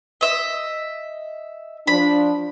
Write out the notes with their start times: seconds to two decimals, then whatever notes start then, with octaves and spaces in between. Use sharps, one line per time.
0.21 D#5 E5
1.87 F3 D4 B5